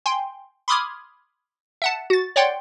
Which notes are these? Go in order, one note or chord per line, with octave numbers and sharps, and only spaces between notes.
G5 G#5 C6
B5 C6 D6 D#6 F6 G#6
E5 F#5 A5
F#4 A6
C#5 D5 F#5 G5 C6